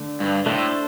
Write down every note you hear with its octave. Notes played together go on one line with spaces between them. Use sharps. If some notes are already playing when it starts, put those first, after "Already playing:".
Already playing: D3 A3 D4
G2
A2 A3 D4 A4 C5